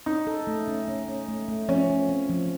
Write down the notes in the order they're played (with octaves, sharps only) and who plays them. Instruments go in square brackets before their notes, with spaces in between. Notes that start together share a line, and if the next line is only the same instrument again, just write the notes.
[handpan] C#4 [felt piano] D#4
[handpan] A4
A3
C#4
C#4
C#4
A3
A3
[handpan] F3 [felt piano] C#4
[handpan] F3
C4
F3